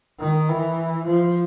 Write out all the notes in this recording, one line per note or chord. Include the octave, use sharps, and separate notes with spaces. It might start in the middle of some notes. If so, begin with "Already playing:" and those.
D#3
E3
F3